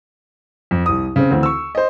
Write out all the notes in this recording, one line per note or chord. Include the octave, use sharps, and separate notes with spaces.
F2
C2 D#6
C#3 C4
D2 E3 C4
C#6 E6
C5 D#5